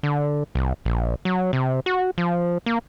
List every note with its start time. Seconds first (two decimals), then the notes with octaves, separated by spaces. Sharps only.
0.03 D3
0.55 C2
0.85 A#1
1.25 F#3
1.53 C3
1.86 F#4
2.18 F3
2.66 A#3